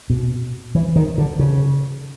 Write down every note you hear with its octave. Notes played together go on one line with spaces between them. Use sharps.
B2
E3
D#3
D3
C#3